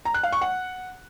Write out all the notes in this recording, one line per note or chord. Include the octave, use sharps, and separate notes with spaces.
A#5
F#6
F5
C#6
F#5